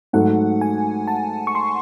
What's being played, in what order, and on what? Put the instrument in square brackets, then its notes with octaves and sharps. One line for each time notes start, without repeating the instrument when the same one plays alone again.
[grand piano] G#2 F#3 A3 [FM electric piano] F#5
[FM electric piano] G#5
A5
C#6
C6